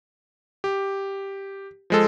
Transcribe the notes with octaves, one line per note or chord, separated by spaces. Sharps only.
G4
F3 G#3 A4